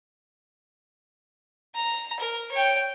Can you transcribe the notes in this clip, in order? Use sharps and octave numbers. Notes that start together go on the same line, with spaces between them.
A#5
A#4
C#5 G5